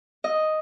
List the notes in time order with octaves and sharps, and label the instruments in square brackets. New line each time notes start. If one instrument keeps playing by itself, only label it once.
[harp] D#5